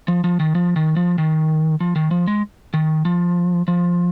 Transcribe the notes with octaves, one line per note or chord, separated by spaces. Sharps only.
F3
F3
D#3
F3
D#3
F3
D#3
F3
D#3
F3
G#3
D#3
F3
F3